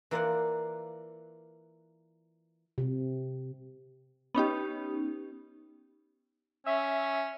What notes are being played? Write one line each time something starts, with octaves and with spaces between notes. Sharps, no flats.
E3 A#3 F4 A#4 D5 F#5
C3
B3 C#4 D#4 G4
C#4 E5